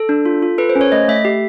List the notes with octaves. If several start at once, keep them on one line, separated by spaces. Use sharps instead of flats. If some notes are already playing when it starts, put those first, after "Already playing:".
Already playing: A4
D4
F4
F4
A4 B4
C5
C#4
C#5
A3 D#5
A3 E5
G4